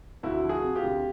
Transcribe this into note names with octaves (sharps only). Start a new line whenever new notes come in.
D2 E4 F#4
F3
F#4 G#4
C3
F4 G4
D2